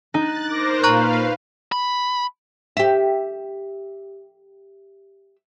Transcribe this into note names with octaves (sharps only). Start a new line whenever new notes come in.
D#4 F#6 A6
A#4 C5 D6 A#6
A#2 B4 F5 A#5 C#6 F#6
B5
G4 E5